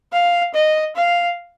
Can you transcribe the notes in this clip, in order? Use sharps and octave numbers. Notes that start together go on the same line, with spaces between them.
F5
D#5
F5